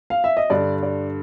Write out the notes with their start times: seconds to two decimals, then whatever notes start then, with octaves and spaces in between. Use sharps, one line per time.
0.10 F5
0.24 E5
0.37 D#5
0.50 G2 D3 D5
0.83 D5